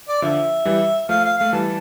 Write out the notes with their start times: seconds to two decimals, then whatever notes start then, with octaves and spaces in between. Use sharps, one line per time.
0.08 D5
0.22 D3 F3 E5
0.65 E3 G3
1.09 F3 A3 F5
1.24 F5
1.38 A3 F5
1.53 E3 G3 A5